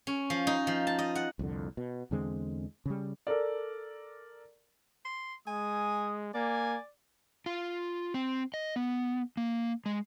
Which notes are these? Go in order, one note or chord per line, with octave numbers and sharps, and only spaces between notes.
C#4
F3
D#4
F3
A5
D#5
F#5
C2 F2 D3
B2
E2 D3 G#3 C4
C#3 G3
A4 A#4 D5
C6
G#3 G#5 D#6
A#3 D5 G#5
F4
C4
D#5
B3
A#3
G#3